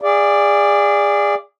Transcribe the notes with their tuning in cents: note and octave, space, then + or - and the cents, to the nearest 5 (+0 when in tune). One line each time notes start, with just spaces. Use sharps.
G#4 -25 D5 +0 F5 -40